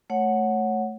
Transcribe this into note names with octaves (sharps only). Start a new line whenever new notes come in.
A3 C#5 F#5